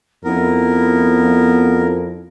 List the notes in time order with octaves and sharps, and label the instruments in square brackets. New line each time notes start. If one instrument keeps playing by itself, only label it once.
[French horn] F2 [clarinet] B3 [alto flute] E4 [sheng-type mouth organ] A#4